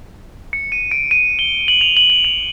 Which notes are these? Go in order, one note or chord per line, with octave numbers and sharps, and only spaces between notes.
C#7
D#7
D7
D#7
G7
F#7
F7
F#7
F#7
F7